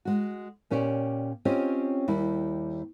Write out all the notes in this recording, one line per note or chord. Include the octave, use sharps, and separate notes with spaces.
G#3 F#4
A#2 C#4 G4 C#5 D5
C4 C#4 F4 G4 C#5 D#5
D#2 G3 E4